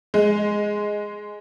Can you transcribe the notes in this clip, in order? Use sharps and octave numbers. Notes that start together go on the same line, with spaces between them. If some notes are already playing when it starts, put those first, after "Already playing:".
G#3